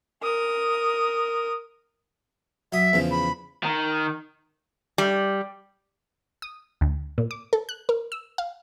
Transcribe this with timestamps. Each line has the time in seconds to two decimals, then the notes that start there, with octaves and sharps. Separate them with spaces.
0.22 A#4 D#6
2.72 F#3 E5 D#6
2.93 E2 C#3 F3
3.11 B5
3.63 D#3
4.98 G3
6.42 D#6
6.81 D2
7.18 A#2
7.31 D6
7.53 A4
7.69 F#6
7.89 A#4
8.12 E6
8.38 F5